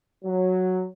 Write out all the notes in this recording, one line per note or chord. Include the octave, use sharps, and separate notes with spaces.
F#3